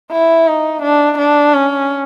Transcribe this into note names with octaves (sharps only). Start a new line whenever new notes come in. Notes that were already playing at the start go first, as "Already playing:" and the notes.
E4
D#4
D4
D4
C#4